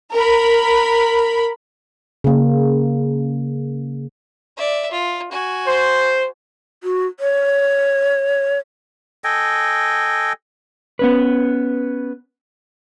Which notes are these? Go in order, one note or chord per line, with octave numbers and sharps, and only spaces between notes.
A#4 B5
C#3 A#3
D5 E5
F4
F#4 G#5
C5
F#4
C#5
A4 D#5 G5 G#5
B3 C#4 B4